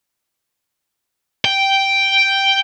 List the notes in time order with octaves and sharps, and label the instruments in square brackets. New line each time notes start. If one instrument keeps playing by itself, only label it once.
[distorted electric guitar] G5